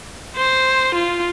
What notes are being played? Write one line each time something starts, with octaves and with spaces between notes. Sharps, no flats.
C5
F4